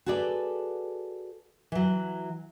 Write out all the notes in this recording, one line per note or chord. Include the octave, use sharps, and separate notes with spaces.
F#4 G#4 A4 B4 D5
E3 F#3